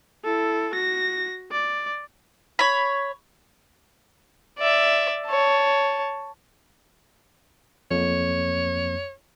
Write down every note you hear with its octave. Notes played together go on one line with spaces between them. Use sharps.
E4 A4
F#4 A#6
D5
C#5 B5
D5 E5
C#5 A5
F2 A#3 C#5